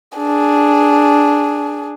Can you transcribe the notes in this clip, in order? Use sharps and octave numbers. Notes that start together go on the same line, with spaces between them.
D4 G#4